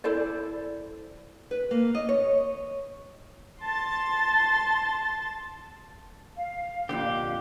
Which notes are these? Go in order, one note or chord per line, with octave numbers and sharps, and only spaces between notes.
E4 A4 C5 D5
B4
A#3
D#5
C#5
A5 C6 A6
F5
F2 A#2 D3 G4